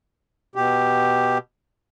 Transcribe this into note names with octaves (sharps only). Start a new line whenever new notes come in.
B2 G4